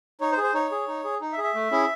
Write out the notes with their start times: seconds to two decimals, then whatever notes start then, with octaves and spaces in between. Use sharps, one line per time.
0.21 D#4 C#5
0.32 C5
0.38 G#4
0.43 C5
0.54 D#4 C#5
0.71 G#4
0.88 D#4
1.04 G#4
1.21 D#4
1.32 E5
1.38 G#4
1.44 E5
1.55 A3
1.71 C#4 E4 G#4